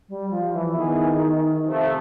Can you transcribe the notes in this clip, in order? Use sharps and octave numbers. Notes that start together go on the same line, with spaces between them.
G3
F3
E3
D#3 B3 E4 G#4
C3 F3 A3